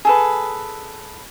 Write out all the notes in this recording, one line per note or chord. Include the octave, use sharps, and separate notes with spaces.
G#4 A4 B4